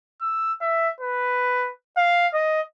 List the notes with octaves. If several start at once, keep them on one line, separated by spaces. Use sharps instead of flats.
E6
E5
B4
F5
D#5